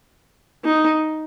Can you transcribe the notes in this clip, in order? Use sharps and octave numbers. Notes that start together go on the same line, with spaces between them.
D#4